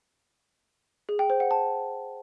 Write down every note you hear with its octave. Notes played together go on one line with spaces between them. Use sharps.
G#4
G5
C5
F#5
A5